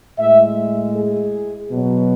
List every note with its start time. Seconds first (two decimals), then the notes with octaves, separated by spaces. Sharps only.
0.19 A2 G#3 E5
0.96 G#4
1.72 B2 F#3